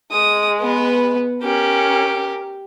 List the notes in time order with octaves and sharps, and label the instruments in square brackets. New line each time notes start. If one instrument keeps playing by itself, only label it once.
[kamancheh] G#3 [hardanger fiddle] D#6
[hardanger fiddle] B3 B4
[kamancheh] C#4 A#4 [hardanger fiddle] G4